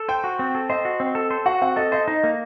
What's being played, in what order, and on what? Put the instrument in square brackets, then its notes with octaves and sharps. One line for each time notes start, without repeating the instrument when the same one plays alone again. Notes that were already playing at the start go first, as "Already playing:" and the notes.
Already playing: [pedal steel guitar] A4
[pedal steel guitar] C5 [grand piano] G5
[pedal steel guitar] F#4
C4
A4
[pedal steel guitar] C5 [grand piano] D#5
[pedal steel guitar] F#4
C4
A4
C5
[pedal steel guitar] F#4 [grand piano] F#5
[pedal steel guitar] C4 [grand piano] F#5
[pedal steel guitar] A4 [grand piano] D#5
[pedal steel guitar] C5 [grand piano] D#5
[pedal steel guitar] D#4
A#3